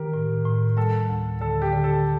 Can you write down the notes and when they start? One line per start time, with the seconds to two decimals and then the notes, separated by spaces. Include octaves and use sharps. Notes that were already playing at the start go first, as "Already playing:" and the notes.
Already playing: D#3 G4 A#4
0.14 A2
0.46 A2
0.77 G3 A4
1.09 D2
1.41 D3 A4
1.62 G4
1.73 D3
1.84 A4